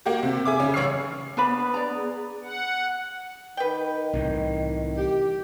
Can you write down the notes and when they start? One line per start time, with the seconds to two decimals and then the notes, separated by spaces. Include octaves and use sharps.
0.06 A#3 F#4 G4
0.23 C3
0.45 G#4 E5 D6
0.60 C#3 C#4
0.74 A1 C#5 C#6 E6 F6 C7
1.37 B3 D4 B4 B5
1.74 D5 A#5
1.96 G#4
2.43 F#5
3.57 D#3 B4 G5
4.13 C2 A2 E3
4.98 G4